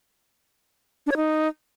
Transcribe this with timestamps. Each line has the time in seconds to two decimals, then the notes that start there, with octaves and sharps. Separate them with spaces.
1.06 D4
1.11 C#5
1.16 D#4